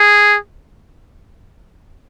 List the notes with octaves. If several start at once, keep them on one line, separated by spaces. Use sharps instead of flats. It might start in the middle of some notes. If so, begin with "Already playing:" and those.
Already playing: G#4